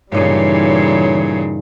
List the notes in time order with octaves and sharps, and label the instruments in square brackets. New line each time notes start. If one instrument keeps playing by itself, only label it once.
[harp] G2 D#4 [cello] A#2 C#3 [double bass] E3 G3 [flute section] C#5